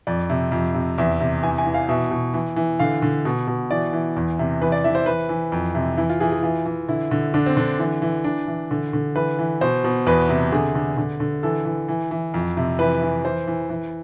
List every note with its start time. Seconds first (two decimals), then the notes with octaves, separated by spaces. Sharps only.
0.07 F2 D5
0.30 C3
0.52 F2
0.74 C3
0.98 E2 E5
1.20 C3
1.43 E3 G#5
1.58 G#5
1.66 E3
1.74 F5
1.89 B2 E5
2.11 B2
2.34 E3
2.56 E3
2.79 D3 F5
3.02 D3
3.25 B2
3.47 B2
3.71 E3 D5
3.93 E3
4.16 E2
4.39 C3
4.62 E3 B4
4.72 D5
4.84 E3 E5
4.95 C5
5.06 E3 B4
5.29 E3
5.52 F2
5.75 C3
5.97 E3 E4
6.10 F4
6.20 E3 G#4
6.32 G#4
6.43 E3 F4
6.66 E3
6.88 D3 E4
7.11 D3
7.34 D3 D4
7.46 C4
7.57 D3 D4
7.79 E3
8.02 E3
8.24 E3 D4
8.48 E3
8.71 D3
8.93 D3
9.15 E3 B4
9.39 E3
9.61 B2 C5
9.84 B2
10.06 E2 B4
10.29 C3
10.52 D3 G#4
10.75 D3
10.97 D3
11.20 D3
11.43 E3 A4
11.65 E3
11.88 E3
12.11 E3
12.34 F2
12.57 C3
12.79 E3 B4
13.02 E3
13.25 E3 C5
13.47 E3
13.70 E3